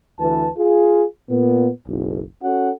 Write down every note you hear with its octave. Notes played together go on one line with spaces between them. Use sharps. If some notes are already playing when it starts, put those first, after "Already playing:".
D2 E3 B4 A5
F4 G#4
A#2 B3
F#1 B1
C#4 F#4 A4 F#5